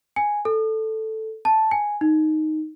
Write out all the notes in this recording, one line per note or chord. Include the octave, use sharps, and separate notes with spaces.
G#5
A4
A5
G#5
D#4